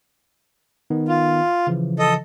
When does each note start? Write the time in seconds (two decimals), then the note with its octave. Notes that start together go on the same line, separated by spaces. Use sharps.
0.90 D#3 B3 D#4
1.08 F4
1.67 C#3 E3 F3
1.99 A4 D#5